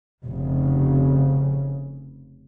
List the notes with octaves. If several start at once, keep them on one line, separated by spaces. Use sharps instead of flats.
F1 C#3